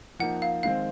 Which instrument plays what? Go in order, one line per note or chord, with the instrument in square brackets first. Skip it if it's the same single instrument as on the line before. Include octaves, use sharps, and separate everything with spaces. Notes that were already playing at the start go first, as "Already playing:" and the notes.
[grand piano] F3 A#3 D#4 [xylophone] F#5
[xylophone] F5
[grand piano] D#3 G#3 C4 [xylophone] F5